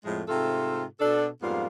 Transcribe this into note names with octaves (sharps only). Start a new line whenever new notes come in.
F2 A2 F3 G#3
G#2 C3 A3 F4 A4
B2 D4 A4
F2 G#2 G3 A#3 B3 F4